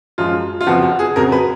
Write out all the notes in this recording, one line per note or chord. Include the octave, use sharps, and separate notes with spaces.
F#2 F3 G#3 F4
F4
F#1 F2 F3 B3 F#4
F#4
G#4
F2 C#3 F#3 A#4
B4